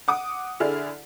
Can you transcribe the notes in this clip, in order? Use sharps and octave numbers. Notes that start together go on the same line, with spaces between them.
F#5 D6 D#6
D3 E4 G#4 D5 F6